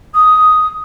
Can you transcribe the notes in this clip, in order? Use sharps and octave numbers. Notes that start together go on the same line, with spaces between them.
D#6